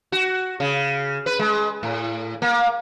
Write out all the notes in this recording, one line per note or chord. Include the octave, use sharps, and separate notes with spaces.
F#4
C#3
B4
G#3
A2
A#3